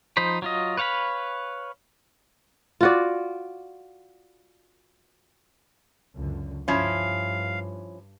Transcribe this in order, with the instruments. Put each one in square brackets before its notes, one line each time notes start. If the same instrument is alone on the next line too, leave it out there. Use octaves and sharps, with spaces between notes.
[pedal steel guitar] F3 D#4 C5 B5
F#3 F4 D#5
B4 C#5 F5 F#5 B5
[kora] F4 F#4 D5
[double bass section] C#2 F#2 D3
[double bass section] G2 [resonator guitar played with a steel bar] F3 C#4 E4 [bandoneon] F5